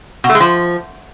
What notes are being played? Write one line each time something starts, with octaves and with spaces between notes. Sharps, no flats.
B2
A3
G#3
F3